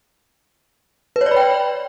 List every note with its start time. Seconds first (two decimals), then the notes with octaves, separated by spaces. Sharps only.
1.16 B4
1.21 C#5
1.26 D5
1.31 B5
1.36 G5